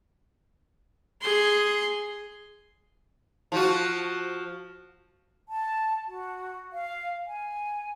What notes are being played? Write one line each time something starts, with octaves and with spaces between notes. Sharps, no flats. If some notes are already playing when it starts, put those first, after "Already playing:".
G#4 C6
F3 F4 F#4
A5
F#4
F5
G#5